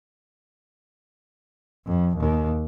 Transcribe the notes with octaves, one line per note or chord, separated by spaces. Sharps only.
F2
D#2